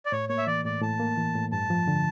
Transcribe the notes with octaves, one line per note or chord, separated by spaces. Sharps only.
D5
A2 C#5
A#3 C#5
E5
E3 D5
A2 D5
A2 A5
A#3
E3
A2
G2 A5
F3
D3